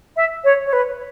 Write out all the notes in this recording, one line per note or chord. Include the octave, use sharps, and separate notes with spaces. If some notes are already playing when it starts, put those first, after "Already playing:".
E5
C#5
C#5
B4